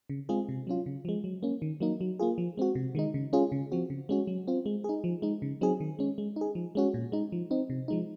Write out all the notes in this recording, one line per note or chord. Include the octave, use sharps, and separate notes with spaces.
C#3
G#3 C4 F4 G#4
C3
F#3 C#4 F4
C#3
F3 G#3
F#3
A#3 C#4
D#3
F#3 A#3 D#4
F#3
A#3 F4 G#4
F3
G#3 C4 F#4
C3
D#3 G#3 D#4
C#3
G#3 C#4 F4 G#4
C#3
F3 C4 F#4
C#3
G#3 C#4 F#4
F#3
C4 F4
G#3
D#4 G#4
F3
G#3 D#4
C#3
F#3 C4 D#4 G#4
D#3
G#3 C#4
G#3
D#4 G#4
F3
G#3 C#4 F#4
A#2
G#3 D#4
F3
C4 D#4
C3
F3 G#3 D#4